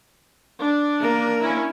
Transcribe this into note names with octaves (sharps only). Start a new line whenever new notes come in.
D4
A#3 A#4
C#4 E4